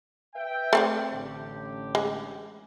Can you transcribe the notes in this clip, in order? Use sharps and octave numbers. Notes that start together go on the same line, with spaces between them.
B4 E5 G5
A3 C4 D5
A1 D3 G4
G#3